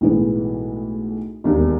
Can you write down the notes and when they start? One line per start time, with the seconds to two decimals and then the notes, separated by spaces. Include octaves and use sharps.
0.01 B1 A2 E3 G#3 B3
1.44 E1 D#2 D#3